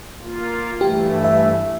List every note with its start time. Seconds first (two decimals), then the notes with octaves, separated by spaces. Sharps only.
0.21 A#3 F4
0.81 G2 E3 A3 G4
1.24 E5